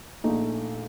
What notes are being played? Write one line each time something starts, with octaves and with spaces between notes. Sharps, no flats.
A#1 A#2 A3 D#4